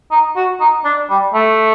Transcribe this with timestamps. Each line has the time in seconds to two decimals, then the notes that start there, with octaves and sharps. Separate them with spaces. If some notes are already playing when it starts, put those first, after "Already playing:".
0.11 D#4
0.36 F#4
0.61 D#4
0.85 D4
1.10 G3
1.34 A3